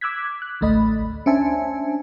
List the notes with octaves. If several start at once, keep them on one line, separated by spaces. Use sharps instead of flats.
D6 E6 F#6 G#6 B6
F#6
A1 D2 A3 D#5 B5
C#4 D4 C5 E5 G#5 A5